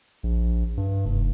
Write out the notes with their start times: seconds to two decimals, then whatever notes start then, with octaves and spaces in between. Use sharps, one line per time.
0.23 A#1
0.77 G2
1.05 F1